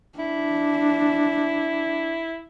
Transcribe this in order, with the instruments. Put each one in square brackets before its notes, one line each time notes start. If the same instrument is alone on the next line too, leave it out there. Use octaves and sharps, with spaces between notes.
[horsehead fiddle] D4 [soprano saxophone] E4